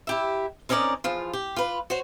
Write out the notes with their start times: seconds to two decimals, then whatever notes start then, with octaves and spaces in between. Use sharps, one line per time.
0.07 E4 G4 E5
0.69 C4 C#4 D#4 A#4 D5 D#5
1.04 E2 F3 F4
1.33 G4
1.56 F4 B4
1.90 F#4 C5 C#5